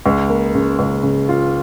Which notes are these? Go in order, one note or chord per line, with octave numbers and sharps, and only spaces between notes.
C#2
A#3
C#3
C#2
C#3
F4